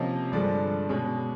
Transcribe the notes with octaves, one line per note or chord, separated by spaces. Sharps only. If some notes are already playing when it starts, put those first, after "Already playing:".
Already playing: C3 F3 A#3 C#4 D#5
G2 D3 F3 G#3 D5
B2 G#3 C#4